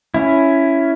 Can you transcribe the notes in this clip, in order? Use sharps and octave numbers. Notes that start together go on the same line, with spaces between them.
C#4 E4